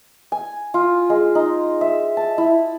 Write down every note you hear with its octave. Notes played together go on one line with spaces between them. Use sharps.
G#5
F4
G#3
D#4
E5
A5
E4